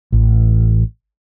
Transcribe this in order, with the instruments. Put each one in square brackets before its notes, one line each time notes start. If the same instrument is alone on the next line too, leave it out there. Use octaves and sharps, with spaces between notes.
[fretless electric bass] A1